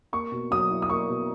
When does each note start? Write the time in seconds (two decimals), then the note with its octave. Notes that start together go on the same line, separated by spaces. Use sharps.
0.13 A#3 C#6
0.32 B2
0.51 F#3 D#6
0.71 E4
0.82 D#6
0.90 A#3 C#6
1.09 B2